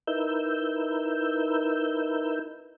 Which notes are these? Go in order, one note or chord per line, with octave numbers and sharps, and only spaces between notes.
D#4 E4 A#4 B4 E6 G6